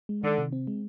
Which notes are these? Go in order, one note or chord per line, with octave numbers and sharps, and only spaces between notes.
G#3
D3 D#3
C3
C4
G#3